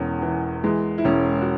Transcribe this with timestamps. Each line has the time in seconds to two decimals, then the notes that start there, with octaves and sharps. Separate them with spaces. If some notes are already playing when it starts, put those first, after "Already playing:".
Already playing: E1 E2 C#4
0.22 E3
0.64 E3 G#3
0.98 E4
1.04 E1 C#4
1.41 F#4